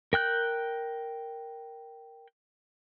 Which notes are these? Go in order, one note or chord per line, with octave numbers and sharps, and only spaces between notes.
A#4 G5 F#6 G6